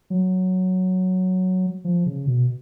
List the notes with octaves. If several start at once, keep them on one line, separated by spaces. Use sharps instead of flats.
F#3
F3
C#3
B2